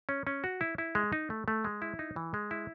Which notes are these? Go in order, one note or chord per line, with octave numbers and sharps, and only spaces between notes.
C#4
C#4
F#4
E4
E4
G#3
D#4
A3
A3
G#3
E4
D#4
E3
G#3
E4